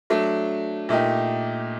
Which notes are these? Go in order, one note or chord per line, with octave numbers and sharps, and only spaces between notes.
F#3 A3 D4
A#2 A3 D#4 G4